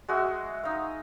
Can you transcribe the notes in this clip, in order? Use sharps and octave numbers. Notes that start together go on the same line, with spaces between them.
G#3 F#4 E5
D#4 F5